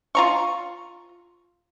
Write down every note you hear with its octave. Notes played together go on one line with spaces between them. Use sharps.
F4 A#5 C#6